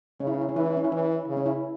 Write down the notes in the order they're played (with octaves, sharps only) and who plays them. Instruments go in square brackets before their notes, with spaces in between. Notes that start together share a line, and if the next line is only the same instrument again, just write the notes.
[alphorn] C#3 [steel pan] C#4
[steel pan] E4
C#4
E4
C#4
[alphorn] E3 [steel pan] E4
[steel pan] C#4
E4
C#4
E4
[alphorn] E3 [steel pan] C#4
[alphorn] C#3
[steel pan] C#4
E4